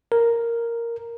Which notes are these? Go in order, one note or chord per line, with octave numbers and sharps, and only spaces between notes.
A#4